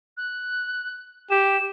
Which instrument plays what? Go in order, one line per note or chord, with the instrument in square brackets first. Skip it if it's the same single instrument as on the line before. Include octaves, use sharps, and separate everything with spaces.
[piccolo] F#6
[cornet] G4 [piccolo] E7